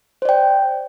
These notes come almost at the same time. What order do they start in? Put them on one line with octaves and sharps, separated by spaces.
C5 D5 G5